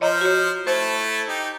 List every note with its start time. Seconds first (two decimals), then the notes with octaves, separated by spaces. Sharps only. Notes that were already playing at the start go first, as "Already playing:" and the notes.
0.01 F3 C5 C#5 D#5 A#5
0.21 F#4 C#5
0.67 A3 E4 A4 C5
1.28 D#4 G4